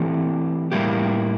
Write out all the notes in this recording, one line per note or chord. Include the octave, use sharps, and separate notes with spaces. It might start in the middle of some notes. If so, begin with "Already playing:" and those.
Already playing: E3 A3 C4 E4 G4
A2 G3 A#3 E4 G4